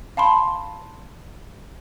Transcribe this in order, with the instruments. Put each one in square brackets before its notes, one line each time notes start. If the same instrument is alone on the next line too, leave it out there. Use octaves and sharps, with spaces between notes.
[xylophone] F5 A5 B5 C6